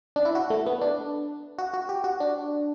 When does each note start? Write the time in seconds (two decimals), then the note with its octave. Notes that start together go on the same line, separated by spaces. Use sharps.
0.16 D4
0.25 E4
0.35 F#4
0.50 A3
0.66 B3
0.81 D4
1.59 F#4
1.74 F#4
1.89 G4
2.04 F#4
2.20 D4